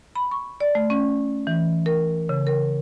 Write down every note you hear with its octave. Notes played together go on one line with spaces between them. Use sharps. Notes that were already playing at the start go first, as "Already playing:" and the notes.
B5
C#6
D5
A3
C#4
E3
A#4
C#3
A#4